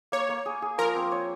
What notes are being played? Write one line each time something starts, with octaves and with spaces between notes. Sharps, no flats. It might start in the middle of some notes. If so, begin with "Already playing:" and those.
A#3 C#5
A#3
G#4
G#4
F3 A#4
C4
C#5